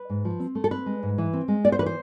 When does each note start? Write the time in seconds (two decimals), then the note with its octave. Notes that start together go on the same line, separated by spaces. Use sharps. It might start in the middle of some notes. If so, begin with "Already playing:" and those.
Already playing: B4
0.10 G#2
0.25 F3
0.40 C4
0.55 A3
0.64 A4
0.71 C4 B4
0.86 G#3
1.03 G#2
1.18 E3
1.33 C4
1.48 G#3
1.64 B3 D5
1.72 C5
1.79 E3 B4
1.86 C5